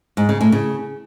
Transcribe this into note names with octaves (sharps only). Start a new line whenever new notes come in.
G#2
C#3
A2
C#3